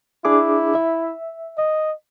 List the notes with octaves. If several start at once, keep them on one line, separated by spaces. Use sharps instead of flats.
D4 E4 G#4 D6
E5
D#5